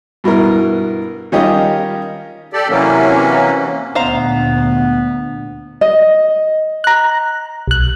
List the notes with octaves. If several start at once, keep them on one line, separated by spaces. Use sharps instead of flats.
G2 B2 E4 A#4
D#3 G3 C#4 F4 G4 D#5
G4 A4 D5
C3 E3 F#3 A#3 C#4
D2 A#2 B3 C5 F5 A#5
D#5
A#5 F#6
B1 F#6